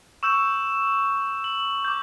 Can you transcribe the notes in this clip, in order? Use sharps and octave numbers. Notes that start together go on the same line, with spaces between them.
C#6 E6 G6 E7
F#7
D6 G6